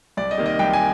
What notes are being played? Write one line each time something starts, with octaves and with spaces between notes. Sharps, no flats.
C2 D5
D#5
C3 D#3 A#3
D#5
C2 G5
G#5